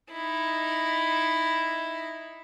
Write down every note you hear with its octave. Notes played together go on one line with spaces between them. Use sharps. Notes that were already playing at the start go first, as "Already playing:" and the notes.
D#4 E4